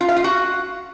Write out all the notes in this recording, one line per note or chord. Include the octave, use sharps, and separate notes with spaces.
F4
F5
F4
F#4